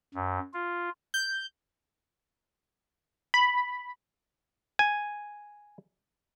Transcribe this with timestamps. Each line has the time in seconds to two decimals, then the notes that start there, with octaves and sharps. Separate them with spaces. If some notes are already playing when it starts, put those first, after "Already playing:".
0.14 F#2
0.54 F4
1.14 G6
3.34 B5
4.79 G#5